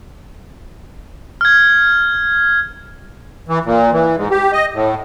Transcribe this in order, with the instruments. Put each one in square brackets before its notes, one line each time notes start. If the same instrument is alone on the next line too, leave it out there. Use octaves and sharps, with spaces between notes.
[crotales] F6 G#6
[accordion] E3
A#2
E3
G#2
G4
D#5
A2